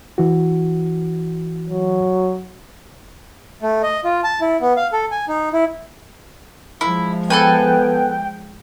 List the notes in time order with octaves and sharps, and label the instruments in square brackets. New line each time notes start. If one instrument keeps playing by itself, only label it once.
[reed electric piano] E3 F#4
[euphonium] F#3
[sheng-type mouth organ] A3
D#5
F4
A5
E4
B3
F5
A4
G#5
D#4
E4
[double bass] F3 G#3 [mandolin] E4
[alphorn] B3 [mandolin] A4 B4 G#5 [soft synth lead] G5